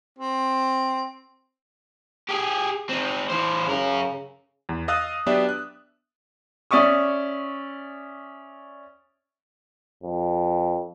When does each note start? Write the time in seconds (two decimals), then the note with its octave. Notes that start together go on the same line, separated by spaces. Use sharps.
0.18 C4
2.29 G4 G#4
2.89 C4 D#4
3.29 E3 C5
3.68 F#2 C#3 A#4
4.69 E2
4.88 D#5 F5 D#6 E6 F#6 A6
5.26 F#3 B3 D4 G4 D5 E5
5.49 F#6
6.71 C#4 D5 E5 C#6 D#6
10.03 F2